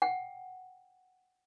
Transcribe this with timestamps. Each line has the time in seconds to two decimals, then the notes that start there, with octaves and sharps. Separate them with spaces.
0.02 F#5 G5